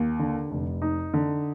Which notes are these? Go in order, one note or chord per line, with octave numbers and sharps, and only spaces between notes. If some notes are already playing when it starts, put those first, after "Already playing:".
Already playing: D#2
D3
F1
D#4
D3